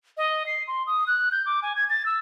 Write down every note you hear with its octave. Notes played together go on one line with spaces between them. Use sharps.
D#5
C7
C6
D#6
F#6
G6
D6
G#5
G#6
A6
E6